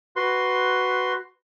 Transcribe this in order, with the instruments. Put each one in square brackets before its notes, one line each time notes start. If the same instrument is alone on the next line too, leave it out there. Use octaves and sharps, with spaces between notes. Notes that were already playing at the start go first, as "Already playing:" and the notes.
[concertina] F#4 B4 C6